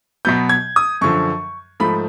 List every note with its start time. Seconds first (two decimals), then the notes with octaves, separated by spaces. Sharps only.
0.25 B2 F#3 B3 G6
0.49 G#6
0.76 D#6
1.01 F#2 D3 F3 C#6
1.80 G#2 F3 A3 B5